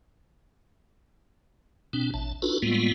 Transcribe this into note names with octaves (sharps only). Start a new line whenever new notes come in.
B2 C4 D4
A1 A5
D4 D#4 F4 F#4 A4 B4
A2 G3 G#3 A#3 B3 F4